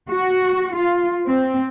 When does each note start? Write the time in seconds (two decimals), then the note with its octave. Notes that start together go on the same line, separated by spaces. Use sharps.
0.10 F#4
0.76 F4
1.26 C4